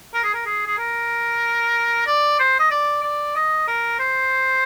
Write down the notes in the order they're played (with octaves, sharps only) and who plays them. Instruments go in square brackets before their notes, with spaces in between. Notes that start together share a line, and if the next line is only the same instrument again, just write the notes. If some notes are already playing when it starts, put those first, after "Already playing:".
[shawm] A#4
G#4
A#4
G#4
G#4
A#4
D5
C5
D#5
D5
D5
D#5
A#4
C5